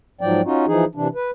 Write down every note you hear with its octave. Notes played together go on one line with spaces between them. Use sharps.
G#2 F3 F#3 D5 G5
C#4 D#4 F4 F#4
E3 F3 D#4 G#4
C3 E3 D4
B4